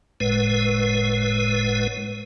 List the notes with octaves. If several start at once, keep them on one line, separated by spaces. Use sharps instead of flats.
F#1 A2 G#3 B4